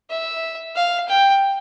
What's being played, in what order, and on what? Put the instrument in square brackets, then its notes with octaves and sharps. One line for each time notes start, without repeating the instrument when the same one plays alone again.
[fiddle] E5
F5
G5